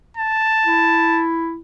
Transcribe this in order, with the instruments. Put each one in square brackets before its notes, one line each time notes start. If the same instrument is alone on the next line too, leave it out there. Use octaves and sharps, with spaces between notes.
[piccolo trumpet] A5
[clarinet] E4